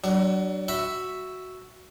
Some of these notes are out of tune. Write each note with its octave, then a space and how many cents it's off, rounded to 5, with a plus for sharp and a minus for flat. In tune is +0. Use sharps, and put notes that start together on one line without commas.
F#3 +30 D4 +5
F#4 +0 E5 +0 B5 +0